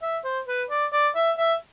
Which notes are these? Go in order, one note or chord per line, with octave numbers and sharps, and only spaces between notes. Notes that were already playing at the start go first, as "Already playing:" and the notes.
E5
C5
B4
D5
D5
E5
E5